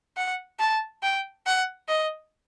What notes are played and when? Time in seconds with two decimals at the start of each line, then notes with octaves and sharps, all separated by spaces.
0.17 F#5
0.59 A5
1.03 G5
1.46 F#5
1.89 D#5